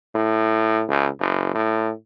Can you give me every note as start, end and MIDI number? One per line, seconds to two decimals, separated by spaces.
0.15 0.83 45
0.88 1.08 37
1.20 1.52 30
1.55 1.92 45